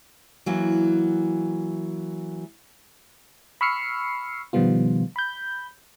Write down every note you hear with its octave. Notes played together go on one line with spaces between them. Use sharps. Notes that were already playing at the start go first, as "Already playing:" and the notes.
E3 F#3 A#3
B5 C#6 E6 F6 C7 C#7
B2 D#3 F3 G3 B3 F4
B5 G6